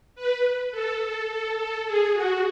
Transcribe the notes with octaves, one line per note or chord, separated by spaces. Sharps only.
B4
A4
A4
A4
A4
G#4
F#4